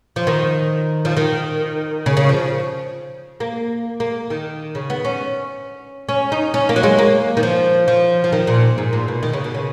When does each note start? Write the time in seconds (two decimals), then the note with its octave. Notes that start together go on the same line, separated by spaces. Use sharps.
0.16 F3
0.27 D#3
1.05 F3
1.17 D#3
2.06 C#3
2.17 C#3
2.29 F3
3.40 A#3
4.00 A#3
4.30 D#3
4.75 C#3
4.90 B3
5.05 C#4
6.09 C#4
6.32 D#4
6.54 C#4
6.69 A#3
6.76 F#3
6.83 G#3
6.98 A#3
7.37 D#3
7.43 F3
7.88 F3
8.24 F3
8.32 D#3
8.47 A#2
8.78 G#2
8.93 A#2
9.08 B2
9.23 D#3
9.33 C#3
9.44 B2
9.55 C#3